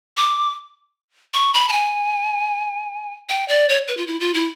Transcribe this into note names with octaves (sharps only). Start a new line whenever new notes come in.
D6
C#6
B5
A5
G#5
G5
D5
C#5
B4
F4
E4
F4
E4